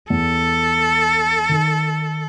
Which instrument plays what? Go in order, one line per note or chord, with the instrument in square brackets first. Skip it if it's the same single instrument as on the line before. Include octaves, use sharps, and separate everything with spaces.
[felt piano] E2 [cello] A4
[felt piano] D#3